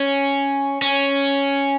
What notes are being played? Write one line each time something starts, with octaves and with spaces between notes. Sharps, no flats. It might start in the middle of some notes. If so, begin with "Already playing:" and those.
Already playing: C#4
C#4